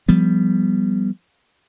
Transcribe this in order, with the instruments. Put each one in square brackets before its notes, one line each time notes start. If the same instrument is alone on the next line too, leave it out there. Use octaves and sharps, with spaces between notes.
[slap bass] F3 G3 B3